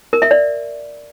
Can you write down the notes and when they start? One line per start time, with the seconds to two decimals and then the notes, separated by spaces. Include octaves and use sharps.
0.13 A#4
0.22 E5
0.31 D5